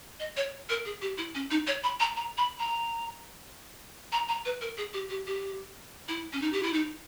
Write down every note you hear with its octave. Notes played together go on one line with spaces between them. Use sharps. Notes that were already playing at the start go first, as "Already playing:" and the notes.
D#5
C#5
A#4
G#4
G4
E4
C#4
D#4
C#5
B5
A#5
A#5
B5
A#5
A#5
A#5
B4
A#4
G#4
G4
G4
G4
E4
C#4
D#4
G4
E4
D#4